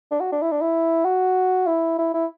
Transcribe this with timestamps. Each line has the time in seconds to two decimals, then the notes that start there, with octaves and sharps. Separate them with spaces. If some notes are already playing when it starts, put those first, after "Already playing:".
0.11 D4
0.20 F#4
0.32 D4
0.42 E4
0.51 D4
0.61 E4
1.05 F#4
1.67 E4
1.98 E4
2.14 E4